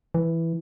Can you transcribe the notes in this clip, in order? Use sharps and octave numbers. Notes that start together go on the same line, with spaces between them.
E3